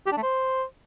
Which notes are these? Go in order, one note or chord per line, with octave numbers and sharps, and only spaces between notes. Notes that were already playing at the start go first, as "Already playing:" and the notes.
G4
D4
A3
C5